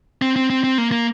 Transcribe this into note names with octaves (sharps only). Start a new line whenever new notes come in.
C4
C4
C4
C4
A#3
A#3